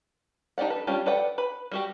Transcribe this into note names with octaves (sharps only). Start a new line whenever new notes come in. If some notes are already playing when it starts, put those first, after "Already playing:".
D4 D#4 G4 D5 F#5
A4 B4
G3 C#4 D4 F4 G4
A4 B4 D5 F#5 G5
B4 B5
G3 F#4 G4